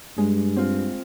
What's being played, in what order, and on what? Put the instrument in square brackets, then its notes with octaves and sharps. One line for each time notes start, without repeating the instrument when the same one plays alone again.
[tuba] G2 [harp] G#3
[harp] C4 F4